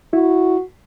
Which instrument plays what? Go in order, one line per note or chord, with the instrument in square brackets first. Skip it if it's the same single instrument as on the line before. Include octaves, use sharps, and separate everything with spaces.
[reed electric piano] E4 [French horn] F#4